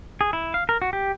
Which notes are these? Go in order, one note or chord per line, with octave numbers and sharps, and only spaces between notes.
G#4
E4
F5
A#4
F#4
G4